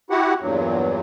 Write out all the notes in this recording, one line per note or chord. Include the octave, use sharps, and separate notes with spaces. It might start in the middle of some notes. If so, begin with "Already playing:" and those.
E4 F#4 G4 F#5
E2 G2 A#2 F#3